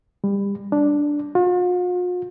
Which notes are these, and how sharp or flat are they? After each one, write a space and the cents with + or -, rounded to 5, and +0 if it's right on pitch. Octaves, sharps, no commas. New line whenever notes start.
G3 +30
D4 +0
F4 +45